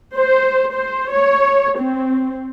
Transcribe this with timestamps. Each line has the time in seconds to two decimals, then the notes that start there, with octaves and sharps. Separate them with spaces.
0.16 C5
0.73 C5
1.12 C#5
1.79 C4